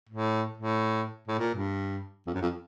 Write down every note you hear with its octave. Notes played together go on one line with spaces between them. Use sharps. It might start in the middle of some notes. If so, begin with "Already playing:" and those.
A2
A2
A2
A#2
G2
F2
F#2
F2